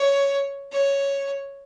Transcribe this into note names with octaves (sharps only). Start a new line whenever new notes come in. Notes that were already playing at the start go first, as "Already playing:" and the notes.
Already playing: C#5
C#5